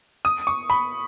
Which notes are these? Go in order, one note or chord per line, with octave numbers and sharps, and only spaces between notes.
D#6
C#6
B5